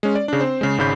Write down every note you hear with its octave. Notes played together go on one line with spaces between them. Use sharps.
G#3 C#4
D5
C#3 D4
C4 C5
C#3 G#3
G#1 G#2 C#3 B5 G6